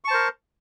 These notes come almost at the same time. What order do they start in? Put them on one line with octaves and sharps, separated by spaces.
C#6 A5 C5 A#4